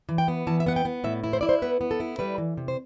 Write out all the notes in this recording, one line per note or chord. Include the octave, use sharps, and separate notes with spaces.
E3
G5
B3
E3 A5
E5
B3 F#5
G5
B3
A2 E5
E4
C5
E4 D5
C5
B3 B4
B3
A4
E4
G3 B4
E3
C3
C5